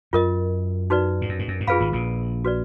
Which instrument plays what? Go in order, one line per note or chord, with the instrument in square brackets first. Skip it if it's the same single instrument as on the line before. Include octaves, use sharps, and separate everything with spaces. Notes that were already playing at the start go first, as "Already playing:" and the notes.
[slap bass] F#2 [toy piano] F4 A#4 D#5
[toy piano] D#4 F#4 B4 D5
[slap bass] G#2
F#2
G#2
F#2
G#2
[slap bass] F#2 [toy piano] F4 G#4 B4 F5 B5
[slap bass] G#1 G#2
A#1 A#2
[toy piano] F#4 B4 D5